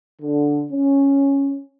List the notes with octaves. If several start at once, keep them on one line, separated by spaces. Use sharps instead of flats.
D3
C#4